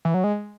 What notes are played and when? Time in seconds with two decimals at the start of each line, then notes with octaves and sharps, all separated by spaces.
0.05 E3
0.14 F#3
0.24 G#3